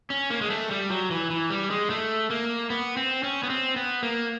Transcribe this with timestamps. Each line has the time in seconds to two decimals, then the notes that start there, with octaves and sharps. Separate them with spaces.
0.10 C#4
0.30 A#3
0.41 G#3
0.50 A3
0.71 G3
0.90 F#3
1.11 E3
1.30 E3
1.50 G3
1.70 G#3
1.90 A3
2.30 A#3
2.70 B3
2.97 C4
3.23 C#4
3.43 B3
3.50 C4
3.76 B3
4.03 A#3